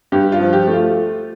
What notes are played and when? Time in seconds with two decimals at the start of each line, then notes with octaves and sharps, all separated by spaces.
0.12 G2 G4
0.32 F4
0.39 F3
0.53 G4
0.67 A3
0.74 F4